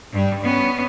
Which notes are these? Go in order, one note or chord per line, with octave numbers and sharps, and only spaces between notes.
G2 G3
B3 C#4